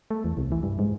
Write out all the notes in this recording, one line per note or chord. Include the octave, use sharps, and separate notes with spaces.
A3
E2
C2
E3
G2
G#2